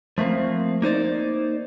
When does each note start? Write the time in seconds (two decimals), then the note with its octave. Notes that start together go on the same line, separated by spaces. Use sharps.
0.18 F3 A3 A#3 C4
0.82 A#3 D#4 C5 D5